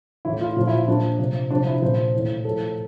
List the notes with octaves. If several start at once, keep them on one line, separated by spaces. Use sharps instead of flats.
A2 E3 E4
F4
A#2 F3 F4
E4
F4
A#2 F3 D4
C3 F3
C3 F3 D4
E4
A#2 F3 C5
A2 E3
A2 F3 A4